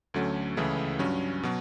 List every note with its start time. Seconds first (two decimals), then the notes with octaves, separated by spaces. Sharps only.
0.14 D2 D3 F#3 A3 C#4
0.57 C#2 C#3 E3 A3 E4
0.99 G2 F#3 C#4
1.43 B2 F#3